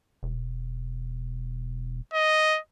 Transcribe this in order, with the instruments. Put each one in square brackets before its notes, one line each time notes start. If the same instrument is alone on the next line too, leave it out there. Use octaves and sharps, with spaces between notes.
[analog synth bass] E1
[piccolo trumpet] D#5